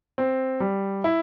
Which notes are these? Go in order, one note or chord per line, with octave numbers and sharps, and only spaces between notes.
C4
G3
E4